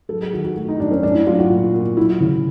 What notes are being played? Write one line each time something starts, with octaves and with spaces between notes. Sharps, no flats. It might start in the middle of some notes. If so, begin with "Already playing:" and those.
F#3 A4
G#4
D#3 F#4
F#4
A3
D#4
F#2 D4
C#4
A3 D4
E4
F#3 F4
F#4
A#2
A#2
F#3 E4
C#3